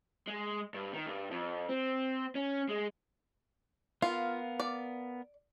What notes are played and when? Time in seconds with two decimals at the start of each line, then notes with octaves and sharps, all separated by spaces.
0.28 G#3
0.74 G2
0.93 D#3
1.07 G2
1.31 F2
1.69 C4
2.35 C#4
2.69 G#3
4.02 B3 F4 A#4 F5
4.60 D5